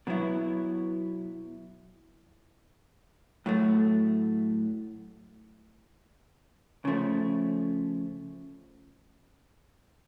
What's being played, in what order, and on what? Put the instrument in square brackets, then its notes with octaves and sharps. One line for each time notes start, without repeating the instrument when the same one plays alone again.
[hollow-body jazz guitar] B2 F#3 B3 E4
A2 F#3 A3
C#3 F3 A3